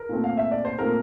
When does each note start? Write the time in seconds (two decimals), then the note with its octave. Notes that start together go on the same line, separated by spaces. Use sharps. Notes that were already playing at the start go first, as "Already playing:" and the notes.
Already playing: A#4
0.09 A#2 A3 C4
0.24 F5
0.37 E5
0.51 D5
0.65 C5
0.78 A#2 A3 C4 A#4